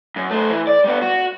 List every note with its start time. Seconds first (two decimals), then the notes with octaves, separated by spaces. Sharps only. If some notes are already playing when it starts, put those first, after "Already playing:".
0.16 F#2
0.31 A3 C5
0.50 E3
0.67 D5
0.84 G3 B3
1.01 F#4